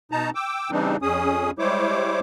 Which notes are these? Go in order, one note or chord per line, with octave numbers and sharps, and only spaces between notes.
B2 D#4 A5 A#5
G5 D6 E6
C#3 E3 G3 C4 D4 D#4
F2 C#4 G#4 D#6
G3 G#3 E4 C5 C#5 D6